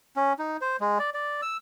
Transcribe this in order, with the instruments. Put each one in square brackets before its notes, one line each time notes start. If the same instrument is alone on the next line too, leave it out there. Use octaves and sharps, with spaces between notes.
[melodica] C#4
D#4
C5
G#3
D5
D5
E6